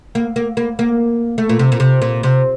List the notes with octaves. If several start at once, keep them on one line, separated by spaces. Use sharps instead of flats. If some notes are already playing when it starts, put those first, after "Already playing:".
A#3
A#3
A#3
A#3
A3
A#2
C3
A#2
C3
A#2
C3